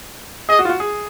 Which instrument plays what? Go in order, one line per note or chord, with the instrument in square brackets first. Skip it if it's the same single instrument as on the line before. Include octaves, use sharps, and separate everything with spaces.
[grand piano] G#4 [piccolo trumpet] D#5
[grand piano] F#4
F4
F#4
G#4